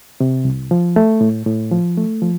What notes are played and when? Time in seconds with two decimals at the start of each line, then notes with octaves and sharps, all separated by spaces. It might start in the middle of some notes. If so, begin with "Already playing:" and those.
0.20 C3
0.45 C2
0.71 F3
0.96 A3
1.21 A2
1.46 A2
1.71 F3
1.98 A3
2.22 F3